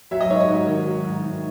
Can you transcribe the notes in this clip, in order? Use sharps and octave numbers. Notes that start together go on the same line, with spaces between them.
F#3 E5
D#5
G#2 C#5
D#5
G#2
D#3
F#3
G#2
G#2